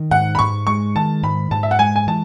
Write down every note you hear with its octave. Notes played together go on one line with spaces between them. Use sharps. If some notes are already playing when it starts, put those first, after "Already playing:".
Already playing: D#3
G#2 F#5
B5
G#2 C#6
G#3 C#6
D#3 A5
G#2 B5
G#2 A5
E5
F#5
G#3 G#5
G#5
E3 A5